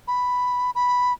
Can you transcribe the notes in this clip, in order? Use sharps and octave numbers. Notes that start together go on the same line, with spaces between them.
B5
B5